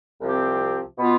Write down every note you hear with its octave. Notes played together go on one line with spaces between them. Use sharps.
C2 C3 F3 C4 G4
B2 B3 F4